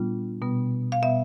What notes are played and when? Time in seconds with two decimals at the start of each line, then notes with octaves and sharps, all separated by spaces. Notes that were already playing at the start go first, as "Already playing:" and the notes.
Already playing: A#2 G3 B3 D4 F4
0.42 B2 G3 B3
0.92 F5
1.02 B2 G3 B3 E5